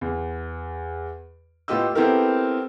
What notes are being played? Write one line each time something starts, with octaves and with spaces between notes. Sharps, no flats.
E2
A2 B3 F4 G4 D#5 E6
B3 C4 E4 G4 A4 A#4